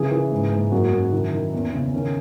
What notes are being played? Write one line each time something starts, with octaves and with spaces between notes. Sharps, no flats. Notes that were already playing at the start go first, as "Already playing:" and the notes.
Already playing: C#3 E3 G#4
E3
G#2
G#2
F#2 F#4
F#2
D#3 E4
D#3
E2
C#3
D#3 C#4